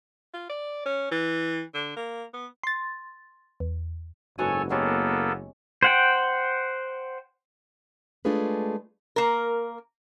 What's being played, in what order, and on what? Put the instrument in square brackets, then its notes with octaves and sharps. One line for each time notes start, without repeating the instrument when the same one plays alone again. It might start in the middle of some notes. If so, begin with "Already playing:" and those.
[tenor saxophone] F4
D5
C#4
E3
D3
A#3
B3
[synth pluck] C6 A6
E2
[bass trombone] F#1 [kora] G#2 B3 F#4 [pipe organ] A4 C#5 G#5
[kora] G#3 C#4 G4 [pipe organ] A#3 B3 A4
[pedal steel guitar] C5 F#5 G5
[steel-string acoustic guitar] G#3 A3 D4 F4 G#4 B4
[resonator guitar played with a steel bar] A#3 A#4